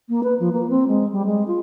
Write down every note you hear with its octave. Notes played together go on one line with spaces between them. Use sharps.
A#3
B4
F3
A#3
C4
G#3
G3
G#3
F4